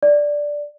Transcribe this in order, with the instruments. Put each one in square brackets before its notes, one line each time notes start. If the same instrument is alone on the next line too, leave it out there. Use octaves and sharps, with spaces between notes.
[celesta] D5